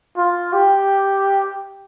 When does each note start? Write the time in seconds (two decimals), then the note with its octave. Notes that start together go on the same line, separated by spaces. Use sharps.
0.17 F4
0.53 G4